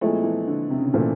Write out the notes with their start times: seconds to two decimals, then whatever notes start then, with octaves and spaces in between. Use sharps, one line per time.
0.01 A#2 F3 G#3 A3 C4 E4
0.24 E3
0.47 D3
0.70 C3
0.78 C#3
0.86 C3
0.94 A#2 E3 A3 C4 F4